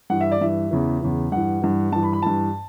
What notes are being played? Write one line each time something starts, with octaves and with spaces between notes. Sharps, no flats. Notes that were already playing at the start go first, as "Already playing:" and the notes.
G2 E3 F#5
E5
D5
G2 E3 E5
E2 C#3 E3
E2 C#3 E3
G2 E3 F#5
G2 E3
G2 E3 A5
B5
B5
G2 E3 A5